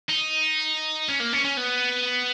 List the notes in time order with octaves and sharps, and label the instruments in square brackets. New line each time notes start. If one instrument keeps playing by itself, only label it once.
[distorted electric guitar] D#4
C#4
A#3
C#4
C#4
B3